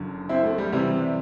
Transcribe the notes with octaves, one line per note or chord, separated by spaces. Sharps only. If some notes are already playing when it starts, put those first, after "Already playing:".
Already playing: F#1 F#2 D3
C4 E4
A3
G3
C3 E3 G3